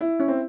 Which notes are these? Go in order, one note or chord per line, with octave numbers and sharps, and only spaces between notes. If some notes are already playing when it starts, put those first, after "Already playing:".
E4
C#4
C4